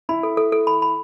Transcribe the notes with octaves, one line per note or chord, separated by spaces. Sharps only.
E4 B5
A4
A4
A4
B5
B5